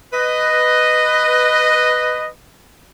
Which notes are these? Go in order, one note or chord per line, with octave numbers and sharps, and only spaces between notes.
B4 D#5